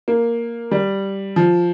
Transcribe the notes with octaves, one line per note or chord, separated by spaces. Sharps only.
A#3
G3
F3